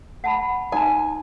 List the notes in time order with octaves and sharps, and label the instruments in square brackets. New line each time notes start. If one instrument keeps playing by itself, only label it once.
[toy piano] F#5 A5 B5
[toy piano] D#4 A5 [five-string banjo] G#5